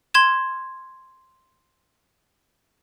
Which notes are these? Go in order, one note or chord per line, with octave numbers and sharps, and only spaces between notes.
C6 G#6 E7